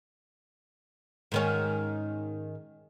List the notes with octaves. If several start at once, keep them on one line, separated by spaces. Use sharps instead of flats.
G#2 D#3 C#4